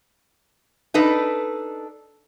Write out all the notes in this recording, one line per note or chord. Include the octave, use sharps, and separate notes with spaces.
D4 D#4 A4 B4